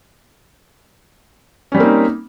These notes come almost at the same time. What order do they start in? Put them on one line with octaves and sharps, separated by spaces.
C#4 G3 C4 A#3 D#4